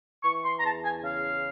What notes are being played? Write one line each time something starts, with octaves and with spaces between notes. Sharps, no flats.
E3 C#6
C6
A#5
E2 A5
G#5
C#3 F5